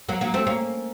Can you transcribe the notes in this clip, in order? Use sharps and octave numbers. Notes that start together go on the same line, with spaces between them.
F#3 A#3
F#3 A#3
A3 C4
A#3 C#4